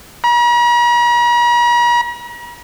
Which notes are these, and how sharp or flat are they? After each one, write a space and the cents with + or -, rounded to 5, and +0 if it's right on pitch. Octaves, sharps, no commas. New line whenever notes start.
A#5 +45